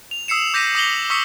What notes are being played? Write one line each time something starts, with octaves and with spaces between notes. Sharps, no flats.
F7
D#6 E6 C7 C#7 E7
D6 G6 A#6 B6 D#7
D#6 A#6 C7 F#7 G7
C#6 D#6 E6 B6 C#7